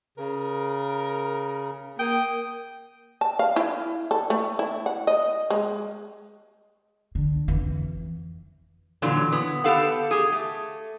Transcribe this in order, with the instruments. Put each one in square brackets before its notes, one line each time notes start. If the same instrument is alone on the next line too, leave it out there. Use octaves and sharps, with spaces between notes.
[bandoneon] C#3 [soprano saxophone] A#4
[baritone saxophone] A#3 [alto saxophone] G5 [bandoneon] D#6
[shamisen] A5
F5
E4
A4
A3
E4
F#5
D#5
G#3
[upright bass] D3
F2 E3
[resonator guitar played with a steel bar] A#2 D3 E3 F#3
B3
B3 G4 A4 F5 F#5
G4 G#4
A3